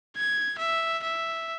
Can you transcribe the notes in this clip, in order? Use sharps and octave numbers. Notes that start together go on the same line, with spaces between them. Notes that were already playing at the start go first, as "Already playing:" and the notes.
G#6
E5
E5